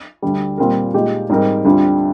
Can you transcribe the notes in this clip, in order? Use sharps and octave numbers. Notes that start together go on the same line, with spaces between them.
D2 D3 G3
A#2 G3 C4 F4 A#4
A#2 G#3 D#4 G4
G#2 G3 C4 D#4 A#4
D2 D3 G3 C4 F4